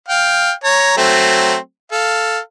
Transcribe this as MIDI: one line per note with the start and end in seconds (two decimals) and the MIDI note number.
0.08 0.52 77
0.08 0.52 79
0.64 0.97 73
0.64 0.97 82
0.97 1.56 54
0.97 1.56 57
0.97 1.56 60
1.92 2.39 69
1.92 2.39 77